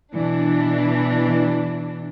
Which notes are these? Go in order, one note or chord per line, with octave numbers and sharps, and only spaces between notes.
B2 E3 D4